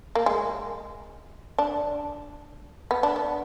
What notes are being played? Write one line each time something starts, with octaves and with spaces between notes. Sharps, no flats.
A#3
G#3
D4
B3
D4
B3